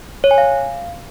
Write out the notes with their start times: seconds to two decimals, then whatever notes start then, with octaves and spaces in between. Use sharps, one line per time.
0.24 C#5
0.31 G#5
0.38 F5